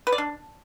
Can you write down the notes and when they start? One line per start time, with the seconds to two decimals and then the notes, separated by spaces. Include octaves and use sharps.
0.07 B4
0.12 D5
0.18 D4